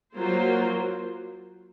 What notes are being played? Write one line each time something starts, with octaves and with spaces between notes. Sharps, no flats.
F#3 A#3 F4 C5